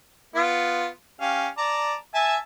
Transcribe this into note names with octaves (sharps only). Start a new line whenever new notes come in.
B3 F4
C#4 G4 F5
D5 A5 A#5
E5 G#5 A5